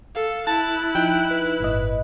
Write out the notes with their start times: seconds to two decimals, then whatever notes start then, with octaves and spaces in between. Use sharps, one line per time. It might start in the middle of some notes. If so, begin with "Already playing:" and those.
0.15 A4 F5
0.47 E4 A5 F#6
0.95 F3 D#4 G5
1.30 B4
1.60 G1 A2 D#5